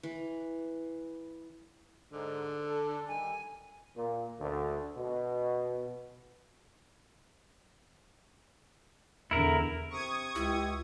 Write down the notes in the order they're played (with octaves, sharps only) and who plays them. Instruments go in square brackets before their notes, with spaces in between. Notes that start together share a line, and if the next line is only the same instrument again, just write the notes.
[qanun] E3
[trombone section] G#2 [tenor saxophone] D3
[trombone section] A4
[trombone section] D#3 G3 [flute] G#5
[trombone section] A#2
D2
B2
[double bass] E2 D3 [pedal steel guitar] E4 A#4
[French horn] C3 [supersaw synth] C#6 D#6 G#6
[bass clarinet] C#2 [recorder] E4 [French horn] G4